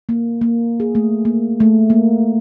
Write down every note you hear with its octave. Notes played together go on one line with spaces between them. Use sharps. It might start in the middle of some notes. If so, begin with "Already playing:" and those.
A#3
A#3
G#4
A3
A#3
A3
A#3